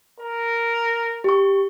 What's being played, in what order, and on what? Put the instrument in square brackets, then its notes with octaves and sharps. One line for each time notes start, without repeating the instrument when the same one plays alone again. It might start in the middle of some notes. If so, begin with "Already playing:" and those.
[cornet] A#4
[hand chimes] G4 C#6